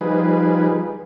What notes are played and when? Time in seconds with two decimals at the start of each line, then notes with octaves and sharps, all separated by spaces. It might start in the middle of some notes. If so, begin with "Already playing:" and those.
0.01 F3 G3 D#4 G#4 B4